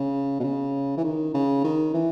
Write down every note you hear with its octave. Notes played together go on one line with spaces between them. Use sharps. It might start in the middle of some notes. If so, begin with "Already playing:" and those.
Already playing: C#3
B2
C#3
E3
D#3
C#3
D#3
E3